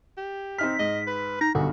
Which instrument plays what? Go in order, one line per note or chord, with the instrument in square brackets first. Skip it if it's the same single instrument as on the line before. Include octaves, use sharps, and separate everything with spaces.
[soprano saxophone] G4
[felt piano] C4 D#4 F6 [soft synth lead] B6
[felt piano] G#2 [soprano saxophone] D#5
[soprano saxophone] B4
[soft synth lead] D#4 [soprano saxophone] A#5
[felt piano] B1 G2 [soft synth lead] D3 [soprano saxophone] F#4